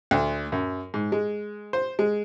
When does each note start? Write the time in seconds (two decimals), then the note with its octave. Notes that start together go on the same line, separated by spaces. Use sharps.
0.11 D2
0.52 F#2
0.94 G#2
1.12 G#3
1.73 C5
1.99 G#3